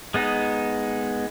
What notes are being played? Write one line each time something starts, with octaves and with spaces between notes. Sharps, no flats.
G#3 B3 D#4